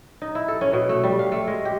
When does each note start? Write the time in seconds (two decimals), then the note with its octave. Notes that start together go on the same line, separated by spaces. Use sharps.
0.22 D#4
0.35 E4
0.48 A4
0.61 C#4
0.73 B2
0.89 A3
1.04 G3
1.19 F5
1.32 A3
1.47 G#3
1.65 G4